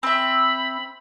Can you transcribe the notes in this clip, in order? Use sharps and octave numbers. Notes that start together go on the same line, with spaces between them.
C4 E5 B5